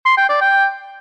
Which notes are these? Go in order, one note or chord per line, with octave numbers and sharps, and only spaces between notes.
C6
G5
D5
G5